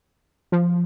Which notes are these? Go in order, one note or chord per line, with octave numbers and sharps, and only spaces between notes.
F3